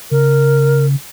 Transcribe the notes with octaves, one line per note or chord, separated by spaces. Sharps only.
C#3 A#4